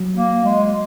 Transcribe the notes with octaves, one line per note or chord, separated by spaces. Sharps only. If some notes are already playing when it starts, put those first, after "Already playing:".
Already playing: F#3
A#3
G#3